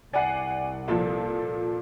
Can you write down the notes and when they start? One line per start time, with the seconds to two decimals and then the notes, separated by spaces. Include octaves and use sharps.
0.13 C2 D5 F#5 G#5 C7
0.88 A#2 F3 A4